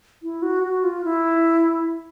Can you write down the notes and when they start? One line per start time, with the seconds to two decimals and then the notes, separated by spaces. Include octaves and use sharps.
0.23 E4
0.42 F#4
0.63 F#4
0.84 F4
1.05 E4